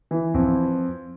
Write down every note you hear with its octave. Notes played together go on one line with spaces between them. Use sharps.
E3
F2